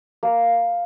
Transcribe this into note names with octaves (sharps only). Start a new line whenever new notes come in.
A#3